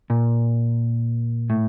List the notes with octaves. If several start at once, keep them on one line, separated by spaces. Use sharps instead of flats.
A#2
A2